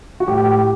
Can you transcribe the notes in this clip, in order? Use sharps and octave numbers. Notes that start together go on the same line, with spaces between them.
F#4
A2 G4